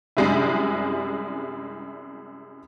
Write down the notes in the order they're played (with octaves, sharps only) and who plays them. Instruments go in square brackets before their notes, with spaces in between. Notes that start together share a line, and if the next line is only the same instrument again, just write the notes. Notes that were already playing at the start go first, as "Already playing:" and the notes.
[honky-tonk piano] F#2 C3 G3 G#3 D4 E4